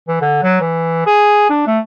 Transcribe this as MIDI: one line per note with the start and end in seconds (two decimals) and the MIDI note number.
0.08 0.16 52
0.21 0.40 50
0.43 0.57 54
0.61 1.01 52
1.06 1.48 68
1.50 1.67 62
1.67 1.79 57